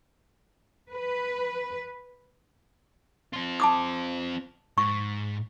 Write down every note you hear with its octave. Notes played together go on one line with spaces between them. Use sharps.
B4
C4 F4
A5 D6 D#6
G#2 C#6